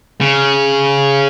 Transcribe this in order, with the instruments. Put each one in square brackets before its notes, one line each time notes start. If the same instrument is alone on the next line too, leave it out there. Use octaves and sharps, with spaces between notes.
[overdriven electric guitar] C#3